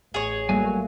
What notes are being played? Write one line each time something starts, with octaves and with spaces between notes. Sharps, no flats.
A1 G#4 C#5
F#3 G3 A3 A#3 G#5